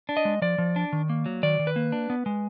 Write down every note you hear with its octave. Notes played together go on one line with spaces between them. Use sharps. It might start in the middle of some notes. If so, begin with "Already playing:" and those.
D4
D#5
G#3
F3 D5
F3
D4
D#3
A#3
F#3
D#3 D5
D#3
B4
A#3
D4
B3
G#3